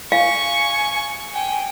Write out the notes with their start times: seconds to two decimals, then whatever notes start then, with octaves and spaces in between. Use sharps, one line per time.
0.12 F5 G#5 C#6
1.34 G5 G#5